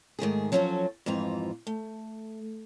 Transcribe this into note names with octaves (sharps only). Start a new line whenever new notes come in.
G#2 D#3 A3 G#4
F3 F#3 C#4 F#4 G#4 A4
F2 G#2 E3 F4 A#5
A3